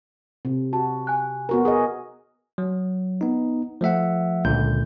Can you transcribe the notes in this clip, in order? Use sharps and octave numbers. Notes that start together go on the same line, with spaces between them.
C3
F#4 A5
G#5 F#6
B3 F#4 A#4
G#4 A#4 D#5
F#3
B3 D#4
F3 A3 E5 F#5
C#2 A#2 D3 G6